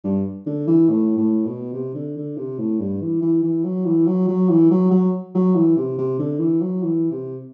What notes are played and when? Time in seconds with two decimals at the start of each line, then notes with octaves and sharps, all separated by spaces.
0.04 G2
0.46 D3
0.67 E3
0.89 A2
1.17 A2
1.45 B2
1.73 C3
1.94 D3
2.17 D3
2.37 C3
2.59 A2
2.80 G2
3.01 E3
3.22 E3
3.43 E3
3.64 F#3
3.85 E3
4.07 F#3
4.28 F#3
4.50 E3
4.71 F#3
4.91 F#3
5.34 F#3
5.55 E3
5.77 C3
5.98 C3
6.19 D3
6.40 E3
6.61 F#3
6.83 E3
7.11 C3